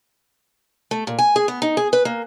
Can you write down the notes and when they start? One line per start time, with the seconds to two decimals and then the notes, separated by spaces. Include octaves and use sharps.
0.91 A3
1.07 A#2
1.19 G#5
1.36 G#4
1.48 B3
1.62 D#4
1.77 G#4
1.93 B4
2.05 A#3